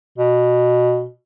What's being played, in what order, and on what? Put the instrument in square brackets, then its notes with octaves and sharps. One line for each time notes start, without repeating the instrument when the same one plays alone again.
[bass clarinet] B2